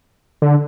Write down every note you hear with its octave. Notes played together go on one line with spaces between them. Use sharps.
D3